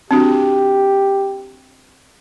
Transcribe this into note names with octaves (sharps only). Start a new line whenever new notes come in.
C4 D4 F#4 G4